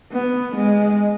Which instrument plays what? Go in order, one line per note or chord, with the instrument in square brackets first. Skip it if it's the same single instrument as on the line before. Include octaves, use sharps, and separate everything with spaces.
[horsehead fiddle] B3
G#3